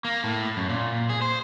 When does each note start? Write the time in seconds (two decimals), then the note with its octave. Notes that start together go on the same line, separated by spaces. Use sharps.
0.05 A#3
0.24 A2
0.57 F#2
0.69 A#2
1.09 G#4
1.22 C5